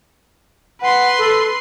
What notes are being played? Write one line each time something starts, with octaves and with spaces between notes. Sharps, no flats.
B4 F#5 C6
A4